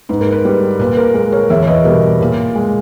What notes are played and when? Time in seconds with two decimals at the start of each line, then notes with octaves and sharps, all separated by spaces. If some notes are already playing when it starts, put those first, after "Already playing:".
0.09 G#2 B4
0.21 A#4
0.32 B4
0.45 G3
0.79 A#2 B4
0.97 A#4
1.14 G#3 A#4
1.32 A#4 C#5
1.50 E2 C#5 E5
1.63 C#5
1.67 B4 D#5
1.85 B2 G3 A#4 C#5
2.21 A#2
2.55 G#3